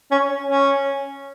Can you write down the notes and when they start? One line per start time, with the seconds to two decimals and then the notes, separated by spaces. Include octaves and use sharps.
0.11 C#4
0.48 C#4